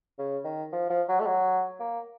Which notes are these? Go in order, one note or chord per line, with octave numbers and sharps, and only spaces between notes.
C#3
D#3
F3
F3
F#3
A3
F#3
A#3